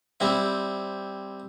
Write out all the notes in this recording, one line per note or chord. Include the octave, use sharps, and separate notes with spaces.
G3 C4 E4